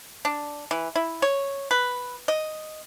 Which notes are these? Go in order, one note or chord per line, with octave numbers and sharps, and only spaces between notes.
D4
E3
E4
C#5
B4
D#5